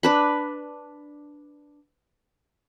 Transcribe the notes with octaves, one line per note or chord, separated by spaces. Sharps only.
D4 B4 B5